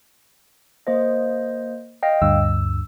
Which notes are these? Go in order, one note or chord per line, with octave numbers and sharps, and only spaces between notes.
A#3 C5 D#5
D#5 F5 G5
D2 G2 E6